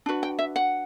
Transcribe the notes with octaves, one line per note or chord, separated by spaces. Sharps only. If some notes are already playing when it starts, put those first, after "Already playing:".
D4 F#4 B4
G5
E5
F#5